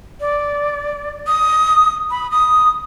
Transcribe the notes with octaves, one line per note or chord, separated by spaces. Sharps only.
D5
D#6
B5
D#6